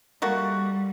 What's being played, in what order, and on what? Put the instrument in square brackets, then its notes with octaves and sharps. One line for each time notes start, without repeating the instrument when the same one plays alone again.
[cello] G3 [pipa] A3 A#3 F#4